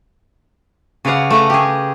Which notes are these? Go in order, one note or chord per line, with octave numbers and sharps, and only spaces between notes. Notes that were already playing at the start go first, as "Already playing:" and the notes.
C#3 B4 C#5 D5 F5 F#5
A3 B4 A#5
G4 G#4